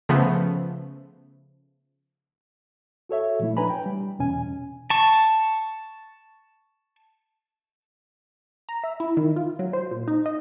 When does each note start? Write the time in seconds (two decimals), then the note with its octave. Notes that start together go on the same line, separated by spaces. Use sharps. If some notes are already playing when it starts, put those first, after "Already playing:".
0.09 C#3 F3 A3 B3
3.09 F#4 A4 C#5 E5
3.39 A#2 F3 A3 E4
3.57 D4 B4 C#5 G#5 A#5 B5
3.70 G5
3.86 G3
4.19 E2 B2 C#4 G#5
4.90 A5 C#6
8.69 A#5
8.84 E5
9.00 E4
9.17 D#3
9.36 F4
9.59 F#3
9.73 C5
9.91 A#2
10.08 D#4
10.26 D#5